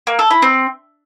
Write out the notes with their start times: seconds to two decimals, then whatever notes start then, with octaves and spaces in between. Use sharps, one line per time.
0.07 A#3
0.19 A4
0.31 E4
0.42 C4